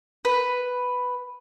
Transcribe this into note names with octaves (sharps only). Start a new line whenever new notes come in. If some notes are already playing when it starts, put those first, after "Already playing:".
B4